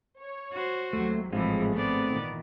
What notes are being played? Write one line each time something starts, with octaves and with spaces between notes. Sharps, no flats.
C#5
F#4 C5
D#2 C3 F#3 A3
G#1 A2 E3 F3 G#3 C4 F4 G#4
A3 B3 C4 D5
A#2 D#3 E3